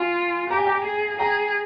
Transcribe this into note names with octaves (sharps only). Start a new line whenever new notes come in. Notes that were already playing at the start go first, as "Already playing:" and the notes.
Already playing: F4 F5 G#5
G4 A#5
G#5
G5 A#5
G#4
G#4 G5 A#5